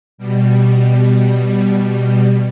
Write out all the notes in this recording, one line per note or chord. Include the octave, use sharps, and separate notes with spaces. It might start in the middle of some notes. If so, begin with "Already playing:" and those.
B2 G3